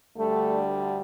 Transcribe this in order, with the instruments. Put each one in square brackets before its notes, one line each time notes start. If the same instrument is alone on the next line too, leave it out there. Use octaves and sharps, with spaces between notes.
[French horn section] D2 D3 G3 A3